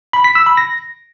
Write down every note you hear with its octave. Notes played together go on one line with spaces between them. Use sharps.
B5
B6
E6
B5
A#6